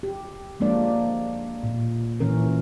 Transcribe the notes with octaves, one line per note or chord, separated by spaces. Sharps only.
G4
F3 G#3 A#3 D4 D5
A#2
A#2 E3 C#4 A#4